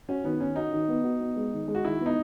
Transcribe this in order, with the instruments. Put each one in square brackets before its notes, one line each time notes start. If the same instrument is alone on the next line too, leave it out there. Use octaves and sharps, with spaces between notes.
[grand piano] C#4 [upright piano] F#4
[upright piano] D#3 [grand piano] B3
[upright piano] D#3 [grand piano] C#4
[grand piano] D#4 [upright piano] F#4
[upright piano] D#3
B3
F#4
B3
G#3
D#3
G#3
[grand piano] F#4
[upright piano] D#3 [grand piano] E4
[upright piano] B3
[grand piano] D#4